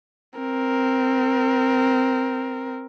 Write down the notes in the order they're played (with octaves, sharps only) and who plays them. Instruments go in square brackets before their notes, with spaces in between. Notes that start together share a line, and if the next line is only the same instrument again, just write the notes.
[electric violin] C4 A#4